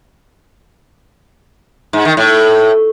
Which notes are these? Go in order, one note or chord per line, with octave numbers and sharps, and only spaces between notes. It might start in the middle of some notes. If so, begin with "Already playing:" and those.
G#2
D#3
A2